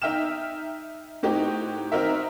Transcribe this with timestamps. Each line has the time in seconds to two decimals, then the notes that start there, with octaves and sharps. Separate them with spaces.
0.02 D#4 E5 G5 F6 E7
1.23 A2 C4 D#4 F#4 G4
1.92 C4 D#4 F#4 A#4 E5